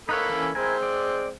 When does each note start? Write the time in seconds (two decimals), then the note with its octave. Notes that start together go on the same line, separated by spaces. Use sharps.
0.09 A#3 D#4 A4 B4 C#5 B5
0.30 E3 C#4
0.55 G#3 C4 E4 A#4 G#5
0.83 D5